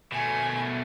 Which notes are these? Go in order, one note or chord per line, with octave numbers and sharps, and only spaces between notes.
B2 A3 G#5